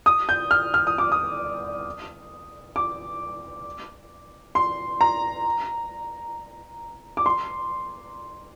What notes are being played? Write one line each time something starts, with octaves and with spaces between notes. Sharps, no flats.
D#6
G6
F6
F6
D#6
D6
D#6
D6
C6
A#5
D6
C6